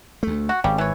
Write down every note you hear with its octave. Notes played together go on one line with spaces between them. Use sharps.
D2 A3
F#4
G#1 C#3 G3
E3 C#5